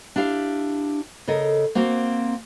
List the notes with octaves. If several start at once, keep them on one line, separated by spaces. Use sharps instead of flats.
D4 E4 G4 F5
C#3 A4 A#4 D#5
A#3 C4 F#4 F5